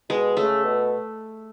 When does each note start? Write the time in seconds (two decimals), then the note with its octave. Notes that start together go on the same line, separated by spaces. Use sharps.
0.09 B2 G#3
0.37 C#3 A3
0.64 B2